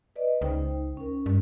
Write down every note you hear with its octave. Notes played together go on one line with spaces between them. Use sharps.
B4 D5 D#5
C#2 D#4 C5 G5
C#4 A#4
G2